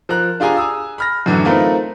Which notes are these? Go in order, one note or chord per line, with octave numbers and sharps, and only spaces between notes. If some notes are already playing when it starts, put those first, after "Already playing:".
F3 A#4 A#5 F#6
D4 F4 G4 G#4 G#5 A#5
G#5 A#5 D#6 E6
B5 F6 A#6
F#2 A2 D3 E3 F#3
A3 C4 D#4 F4 A#4 B4